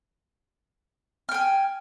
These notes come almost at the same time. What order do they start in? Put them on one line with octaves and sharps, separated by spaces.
F6 G5 G#5